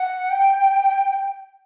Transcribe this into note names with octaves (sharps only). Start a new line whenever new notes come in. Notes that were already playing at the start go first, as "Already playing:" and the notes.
Already playing: F#5
G5